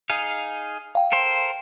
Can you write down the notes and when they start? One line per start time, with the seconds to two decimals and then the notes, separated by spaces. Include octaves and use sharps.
0.10 D#4 G#4 F5
0.95 F5 G5
1.12 A4 A#4 C5